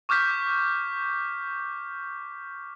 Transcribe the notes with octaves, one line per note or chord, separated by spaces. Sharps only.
C#6 D6 F6 G6 B6